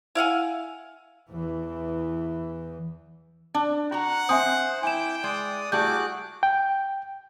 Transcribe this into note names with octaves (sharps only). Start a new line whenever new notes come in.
E4 F5 F#5 G#5
E2 E3
D4
F#4 F#5 A#5
C4 C5 E5 G#5 D#6
E4 G5 G#5 D6 G6 E7
G#3 D5 D#6
G3 A3 E4 F#4 G#4 D6 F#6 G6
G5